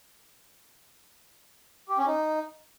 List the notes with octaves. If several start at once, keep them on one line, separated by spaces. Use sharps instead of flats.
G4
C#4
D#4